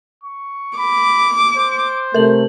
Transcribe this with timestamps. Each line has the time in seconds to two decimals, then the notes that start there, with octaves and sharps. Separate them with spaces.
0.23 C#6
0.78 B5 D6
1.58 C5
2.14 C3 A3 A#4 F#7